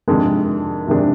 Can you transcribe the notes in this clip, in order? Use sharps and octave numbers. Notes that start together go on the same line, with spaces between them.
F2 C3 D#3 G#3 D4
F2 C3 D#3 G#3 D4